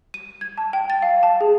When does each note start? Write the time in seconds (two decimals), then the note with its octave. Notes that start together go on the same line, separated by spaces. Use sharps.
0.14 D#7
0.41 G#6
0.58 A5
0.73 G5
0.90 A6
1.02 F5
1.23 A5
1.41 G#4